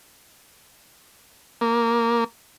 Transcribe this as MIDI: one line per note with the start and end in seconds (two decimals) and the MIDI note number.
1.61 2.24 58